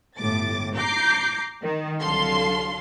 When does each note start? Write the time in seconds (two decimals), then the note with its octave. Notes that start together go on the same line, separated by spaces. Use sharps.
0.18 G1 A2 D6 A6
0.76 A#5 D6 G6 C7
1.63 D#3
2.00 C2 D3 F#3 A4 F5 C6